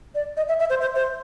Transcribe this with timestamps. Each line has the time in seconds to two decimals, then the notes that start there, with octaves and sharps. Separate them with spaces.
0.15 D5
0.37 D#5
0.48 E5
0.60 E5
0.70 C5
0.81 C5
0.95 C5